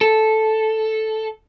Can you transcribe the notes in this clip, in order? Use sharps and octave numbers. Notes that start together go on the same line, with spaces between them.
A4